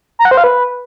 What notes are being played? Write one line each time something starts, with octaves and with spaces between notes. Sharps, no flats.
A#5
F#5
C5
F5
B4